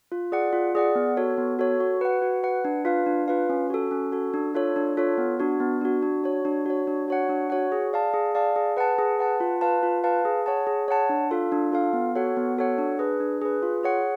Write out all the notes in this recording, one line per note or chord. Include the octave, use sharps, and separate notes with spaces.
F4
G#4 D5 F#5
F4
G#4 D5 F#5
B3
F#4 A4 C#5
B3
F#4 A4 C#5
F#4
B4 F#5
F#4
B4 F#5
D4
F4 B4 F5
D4
F4 B4 F5
C#4
F#4 A4
C#4
F#4 A4
D4
F4 A4 C#5
D4
F4 A4 C#5
B3
D4 F#4
B3
D4 F#4
D4
F#4 C#5
D4
F#4 C#5
D4
F#4 C#5 F#5
D4
F#4 C#5 F#5
G#4
D5 F5 A5
G#4
D5 F5 A5
G#4
B4 F#5 A5
G#4
B4 F#5 A5
F4
B4 F5 A5
F4
B4 F5 A5
G#4
C#5 F#5 A5
G#4
C#5 F#5 A5
D4
F4 A4 F5
D4
F4 A4 F5
B3
F#4 A4 C#5 F#5
B3
F#4 A4 C#5 F#5
D4
G#4 B4
D4
G#4 B4
F4
G#4 C#5 F#5